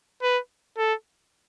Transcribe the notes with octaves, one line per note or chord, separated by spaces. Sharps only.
B4
A4